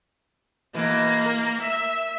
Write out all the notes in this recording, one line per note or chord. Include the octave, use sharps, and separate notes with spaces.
B2 E3 A#3
A#4
E5